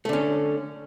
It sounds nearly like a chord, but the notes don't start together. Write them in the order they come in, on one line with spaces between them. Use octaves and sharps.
A3 D3 C#4